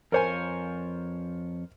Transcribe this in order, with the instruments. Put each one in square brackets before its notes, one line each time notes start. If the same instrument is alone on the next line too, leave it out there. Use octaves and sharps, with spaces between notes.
[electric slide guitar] F2 F4 C#5 [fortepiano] A#4 C5 G#5